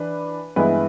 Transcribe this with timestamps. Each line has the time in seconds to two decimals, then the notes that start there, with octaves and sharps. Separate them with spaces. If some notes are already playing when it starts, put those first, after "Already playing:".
Already playing: E3 D4 B4
0.56 G2 E3 G#3 B3 E4 B4